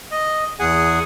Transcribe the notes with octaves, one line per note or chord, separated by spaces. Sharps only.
D#5
E2 G#4 F#5 G#5